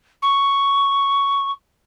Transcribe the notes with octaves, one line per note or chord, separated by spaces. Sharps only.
C#6